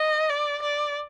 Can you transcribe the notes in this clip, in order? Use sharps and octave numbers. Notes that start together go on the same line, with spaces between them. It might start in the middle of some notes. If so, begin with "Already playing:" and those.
Already playing: D#5
D5
D5